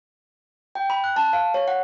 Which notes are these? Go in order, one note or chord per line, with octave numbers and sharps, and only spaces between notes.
G5
B5
F#6
A5
F5
C#5
F#5